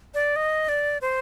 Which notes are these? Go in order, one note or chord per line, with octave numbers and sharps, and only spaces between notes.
D5
D#5
D5
C5